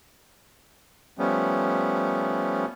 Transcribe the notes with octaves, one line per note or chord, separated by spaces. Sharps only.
F3 G3 A3 B3 C#4